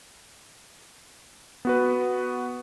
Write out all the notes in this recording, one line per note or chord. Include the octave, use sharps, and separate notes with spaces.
B3 F#4 B4